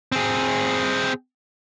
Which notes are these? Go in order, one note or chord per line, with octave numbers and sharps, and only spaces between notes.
C4 G#4